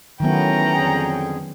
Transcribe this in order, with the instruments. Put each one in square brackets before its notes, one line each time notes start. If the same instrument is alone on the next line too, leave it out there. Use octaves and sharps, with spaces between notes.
[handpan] D#3 F#3 B3 [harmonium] E3 A3 [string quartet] C#4 G5 [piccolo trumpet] A#5
[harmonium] F2 D3 G#4